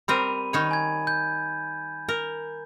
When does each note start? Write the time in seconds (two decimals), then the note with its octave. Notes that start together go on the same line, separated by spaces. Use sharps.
0.08 G3 C4 A#4 B5 D#7
0.53 D#3 D#4 C#5 B5
0.71 G#5 G#6
1.07 G6
2.08 A#4